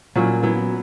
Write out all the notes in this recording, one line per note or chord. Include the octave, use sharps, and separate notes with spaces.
A#2 F#3 C#4 E4
F#3 B3 E4